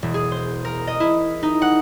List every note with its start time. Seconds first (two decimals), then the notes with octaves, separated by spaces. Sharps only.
0.02 E1
0.14 G#4
0.32 C5
0.65 A#4
0.87 D#5
1.00 E4
1.43 D#4
1.62 F#5